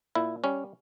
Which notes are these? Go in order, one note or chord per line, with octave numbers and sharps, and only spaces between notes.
A#2 E4
G3 C#4